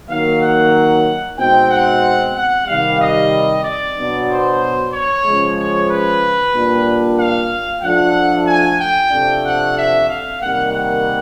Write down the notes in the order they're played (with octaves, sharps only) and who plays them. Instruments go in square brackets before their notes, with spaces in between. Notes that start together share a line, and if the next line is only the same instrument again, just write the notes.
[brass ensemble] D#3 F#3 A#3 F5
F#5
B2 G#3 C4 D#4 G5
F#5
F#5
C3 D#3 G3 F5
D#5
D5
B2 F#3 B3 D4
C5
C#5
C#3 F3 G#3
C#5
B4
A#2 G3 A#3 D4
F5
F3 A3 D4 F#5
G#5
G5
C3 F3 A3 D4
F#5
E5
F5
C3 D#3 G3 A#3 F#5
F#5